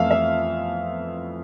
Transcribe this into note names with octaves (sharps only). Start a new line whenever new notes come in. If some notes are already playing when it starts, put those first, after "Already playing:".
Already playing: F2 E3 A3 E5 F5
E5